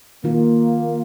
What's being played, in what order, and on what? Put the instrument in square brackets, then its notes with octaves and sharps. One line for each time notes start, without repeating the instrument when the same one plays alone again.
[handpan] D#3 F4 [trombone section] A#3